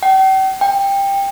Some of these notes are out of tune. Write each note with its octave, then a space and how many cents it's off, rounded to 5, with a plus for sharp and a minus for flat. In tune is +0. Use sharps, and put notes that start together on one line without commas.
G5 -40
G5 +15